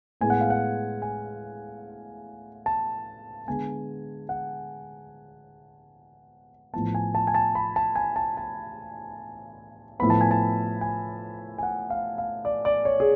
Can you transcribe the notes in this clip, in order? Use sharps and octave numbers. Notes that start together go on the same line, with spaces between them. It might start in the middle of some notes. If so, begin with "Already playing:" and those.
A2 G#3 B3 G#5
F#5
F5
F#5
G#5
A5
D3 G#3 B3 G#5
F#5
A2 F3 B3 A5
G#5
A5
G#5
A5
B5
A5
G#5
A5
A5
A2 F3 B3 B5
A5
G#5
A5
G#5
G#5
F#5
F5
F5
D5
D5
C#5
G#4